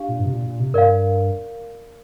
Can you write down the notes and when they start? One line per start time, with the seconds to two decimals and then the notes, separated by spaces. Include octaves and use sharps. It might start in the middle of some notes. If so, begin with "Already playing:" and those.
Already playing: D4 G4 F5
0.09 A#2
0.19 G2
0.25 C3
0.33 A#2
0.47 A#2
0.60 C3
0.74 G2 A#4 D5 F5